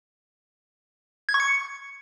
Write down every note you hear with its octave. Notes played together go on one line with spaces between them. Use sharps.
G#6
C#6
C#7